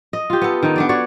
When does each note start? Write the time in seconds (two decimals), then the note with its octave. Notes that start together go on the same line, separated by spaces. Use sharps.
0.13 D#5
0.30 F4 G4
0.42 B3 A4
0.63 D#3 D#4
0.76 B3 D4 D5
0.89 F#4 C#5 D5